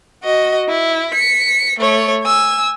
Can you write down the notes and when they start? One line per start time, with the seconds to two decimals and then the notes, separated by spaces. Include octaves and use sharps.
0.24 F#4 D#5
0.68 E4
1.10 B6 C#7
1.79 A3 C#5
2.24 G#5 E6